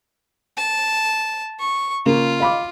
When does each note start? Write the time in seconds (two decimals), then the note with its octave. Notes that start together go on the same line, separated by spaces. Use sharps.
0.57 A5
1.60 C#6
2.06 C#3 A#3 F4
2.40 F5 B5 D6